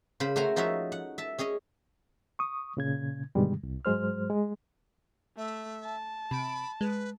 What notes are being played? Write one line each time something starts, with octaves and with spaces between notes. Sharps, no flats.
C#3 C5 B5
A3 F#4 C5 F#5 G#5 A#5
F3 C#4 D#4 F#4 C#5 E5
F#5
E5 A5
C#4 G#4 C#5 D#5
C#6 D#6
A#2 C#3 G#6
G2 B2 D3 D#3 G3 G#3
C2
G#2 F#3 G#3 C5 F6
G#3
A3 E5
A5
C3 B5 D7
G#3 B4